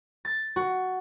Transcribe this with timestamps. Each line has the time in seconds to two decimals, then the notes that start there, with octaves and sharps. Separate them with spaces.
0.25 A6
0.56 F#4